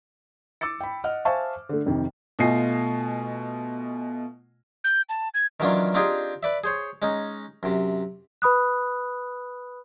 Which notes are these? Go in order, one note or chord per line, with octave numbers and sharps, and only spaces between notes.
D6 E6 A6 C#7
G5 B5
D#5 F#5 F6
C5 E5 F5 G#5 A5 C#6
D3 A3
F2 C3 D#3
B2 A3 F4 D#5 G#5 C7
G6
A5
G#6
D#3 E3 F#3 C#4 D4 F4
C4 D4 D#4 F4 G4 G#4
B4 D5 E5
G#4 C5 C#5
G#3 C#4 D#4
F#2 C3
B4 B5 D#6 F#6